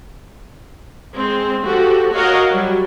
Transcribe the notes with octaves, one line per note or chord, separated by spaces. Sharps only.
G#3 C4
F3 F#4 G4 A4
F#4 A#4 C#5 D#5 F5 F#5
F#3 G3